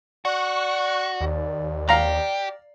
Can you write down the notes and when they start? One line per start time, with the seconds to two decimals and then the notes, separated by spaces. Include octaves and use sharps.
0.25 F#4 D5 C#6 F#6
1.21 D#2
1.89 G4 F5 A#5